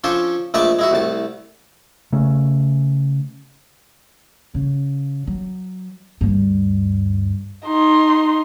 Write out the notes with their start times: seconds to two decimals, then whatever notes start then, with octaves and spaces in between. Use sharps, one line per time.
0.04 F3 C#4 D4 A4 C5
0.54 A#1 G#3 A3 B4 A5 D6
0.79 G#3 E4 F#4
0.91 C2 A2 A5
2.13 C#3 A3
4.54 C#3
5.27 F#3
6.21 D2 G2
7.66 D#4 C6